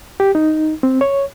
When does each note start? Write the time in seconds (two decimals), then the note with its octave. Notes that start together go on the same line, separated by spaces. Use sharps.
0.20 G4
0.35 D#4
0.83 C4
1.01 C#5